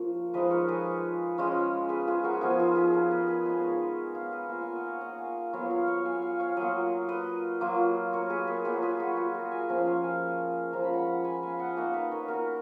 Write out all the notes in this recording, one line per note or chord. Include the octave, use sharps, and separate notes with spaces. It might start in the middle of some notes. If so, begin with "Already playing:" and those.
Already playing: F3 A#3 C#5
F3 G#3 D#4 B4 D#5
A#4 C#5
G#4 B4
G#3 C#4 F4
G#4 B4
F4 G#4
F#4 A#4
F3 B3 D#4 F4 G#4
F4 G#4
G#4 B4
A#4 C#5
B4 D#5
G#4 B4
G#3 D#4 B4 D#5
C#5 F5
C#5 F5
B4 D#5
A#3 F4 C#5 F5
F5 G#5
D#5 F#5
C#5 F5
D#5 F#5
F5 G#5
F#3 B3 F4 C#5 F5
C#5 F5
C#5 F5
F5 G#5
F5 G#5
C#5 F5
F#3 A#3 F4 D#5 F#5
B4 D#5
F#3 A#3 F4
A#4 C#5
G#4 B4
G#4 B4
F#3 A#3 F4 G#4 B4
G#4 B4
F#4
F4 G#4
F#4 A#4
F5 G#5
F3 A#3 C#4 F4 F5 G#5
C#5 F5
F5 G#5
F3 G#3 C#4 A#5
B5
F#5 A#5
G#5 B5
F5 G#5
D#5 F#5
A#3 D#4 C#5 F5
B4 D#5
A#4 C#5
F#4 A#4